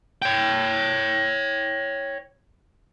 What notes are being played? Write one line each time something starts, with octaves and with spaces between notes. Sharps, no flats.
C#5 G5